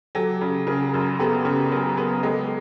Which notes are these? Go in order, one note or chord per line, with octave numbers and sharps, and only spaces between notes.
F#3 G4 A4
C#3
C#3 G#4 A#4
F#2
B3 G4 A4
C#3
F#3 G#4 A#4
B3
G#3 G4 A4